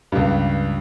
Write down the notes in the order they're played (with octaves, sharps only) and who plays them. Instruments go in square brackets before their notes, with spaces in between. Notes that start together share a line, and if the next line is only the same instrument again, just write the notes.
[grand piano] C#2 G2